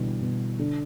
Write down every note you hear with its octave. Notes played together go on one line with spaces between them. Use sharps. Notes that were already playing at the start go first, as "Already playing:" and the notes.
Already playing: B2 D3 E3 G3
B2
D3